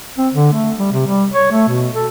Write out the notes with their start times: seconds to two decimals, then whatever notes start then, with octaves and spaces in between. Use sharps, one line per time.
0.18 C4
0.34 D3
0.53 A3
0.79 G3
0.92 C3
1.07 G3
1.34 C#5
1.52 A3
1.68 B2
1.95 A4